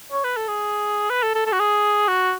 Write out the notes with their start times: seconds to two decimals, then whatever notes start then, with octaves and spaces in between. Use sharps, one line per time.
0.12 C#5
0.24 B4
0.37 A4
0.48 G#4
1.10 B4
1.23 A4
1.35 A4
1.46 A4
1.53 F#4
1.60 G#4
2.08 F#4